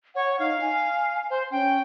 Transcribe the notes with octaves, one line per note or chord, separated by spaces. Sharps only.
C#5 F#5
D#4 F5
G#5
C5
C#4 G5